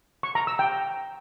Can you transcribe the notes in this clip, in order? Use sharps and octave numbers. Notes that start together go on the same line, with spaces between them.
C#6
A#5
E6
G5